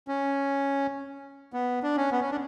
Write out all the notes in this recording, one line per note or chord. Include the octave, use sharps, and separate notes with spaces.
C#4
B3
D4
C#4
B3
C#4
D4